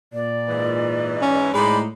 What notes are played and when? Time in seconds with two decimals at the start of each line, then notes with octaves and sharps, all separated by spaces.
0.13 A#2 D5
0.48 G#2 E3
1.22 C#4
1.54 A2 G#3 D#4 C5 D5 B5